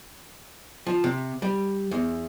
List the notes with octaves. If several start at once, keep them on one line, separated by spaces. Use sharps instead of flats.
F3
C3
G3
E2